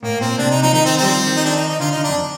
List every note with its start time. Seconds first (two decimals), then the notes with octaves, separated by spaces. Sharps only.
0.03 A2 A#3
0.20 A#2 C4
0.38 C3 D4
0.51 D#4
0.62 F3 D#4
0.74 D#3 D#4
0.85 C4
0.97 C4
1.02 G3
1.08 F3
1.26 D#3
1.36 D#4
1.45 D4
1.56 D#4
1.68 D#4
1.80 D3 F4
1.91 D#4
1.97 D3
2.04 D4
2.09 F2